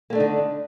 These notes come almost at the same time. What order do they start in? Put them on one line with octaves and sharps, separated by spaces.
A#3 A3 D4 D#4 D3